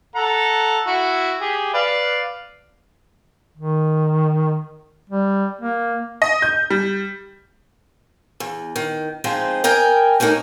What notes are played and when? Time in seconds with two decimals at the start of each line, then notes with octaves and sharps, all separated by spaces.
0.15 A4 F#5 A#5
0.87 E4 F#4
1.41 G4 G#4
1.74 B4 D5 F5
3.57 D#3
5.10 G3
5.61 A#3
6.22 D#5
6.42 G6
6.70 G3
8.40 E2
8.76 D#3
9.24 F3 G#3 C4 D#4
9.64 A#4 D#5 G5 G#5
10.20 A3 A#3 C#4 D#4 A#4